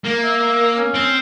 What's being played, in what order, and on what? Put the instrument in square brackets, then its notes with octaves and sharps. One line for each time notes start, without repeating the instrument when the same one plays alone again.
[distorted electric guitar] A#3
[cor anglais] E5
C#4
[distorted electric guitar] C4